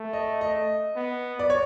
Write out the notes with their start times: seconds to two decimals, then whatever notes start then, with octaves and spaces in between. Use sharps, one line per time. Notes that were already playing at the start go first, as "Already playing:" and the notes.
Already playing: A3
0.13 D#5
0.41 D#5
0.96 B3
1.39 D5
1.50 C#5